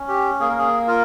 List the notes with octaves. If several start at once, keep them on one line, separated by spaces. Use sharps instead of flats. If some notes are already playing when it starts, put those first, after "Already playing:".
Already playing: C#4
G4
A#3 G#4
A#4
G#4
F4 A#4